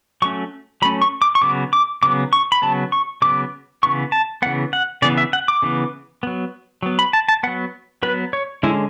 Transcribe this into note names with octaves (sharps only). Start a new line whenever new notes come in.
F#3 A3 C#4 C#6
F#3 A3 C#4 B5
C#6
D6
C#6
C#3 F#3 B3 D6
D6
C#3 F#3 B3 D6
C#6
B5
C#3 F#3 B3 A5
C#6
C#3 F#3 B3 D6
C#3 E3 B3 C#6
A5
C#3 E3 B3 F#5
F#5
C#3 E3 B3 D5
E5
F#5
D6
C#3 E3 B3
F#3 B3
F#3 B3
B5
A5
A5
F#3 B3 F#5
F#3 B3 B4
C#5
D3 G#3 C#4 E4